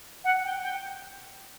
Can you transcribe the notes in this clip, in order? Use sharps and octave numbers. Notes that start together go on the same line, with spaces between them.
F#5
G5
G5